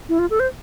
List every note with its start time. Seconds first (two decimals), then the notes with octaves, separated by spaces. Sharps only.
0.09 E4
0.19 F4
0.30 A4
0.40 C5